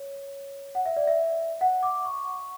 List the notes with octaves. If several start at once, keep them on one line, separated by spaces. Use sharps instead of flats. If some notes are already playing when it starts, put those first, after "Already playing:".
Already playing: C#5
F#5
E5
D5
E5
F#5
D6
C#6